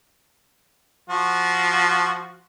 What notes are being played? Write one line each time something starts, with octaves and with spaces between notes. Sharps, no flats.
F3 F#4